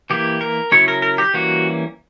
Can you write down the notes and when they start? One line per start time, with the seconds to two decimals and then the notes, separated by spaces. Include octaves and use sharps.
0.10 E3 A#3 E4 G4
0.41 A#4
0.72 C#3 F#3 C#4 E4 C#5
0.88 A#4
1.02 A#4
1.18 G4
1.34 E3 G3 A#3 C#4 F#4